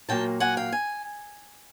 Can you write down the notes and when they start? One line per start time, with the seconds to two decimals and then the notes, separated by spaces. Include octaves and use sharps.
0.09 A#2 F#3 A#3 G5 A5
0.40 F#5 G#5
0.57 F5 G5
0.72 G#5